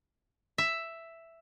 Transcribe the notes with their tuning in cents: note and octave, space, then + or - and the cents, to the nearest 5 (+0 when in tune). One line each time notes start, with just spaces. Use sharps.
E5 +5